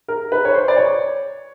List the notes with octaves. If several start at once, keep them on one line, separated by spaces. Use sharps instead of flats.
A#4
B4
C#5
C5
D5
C#5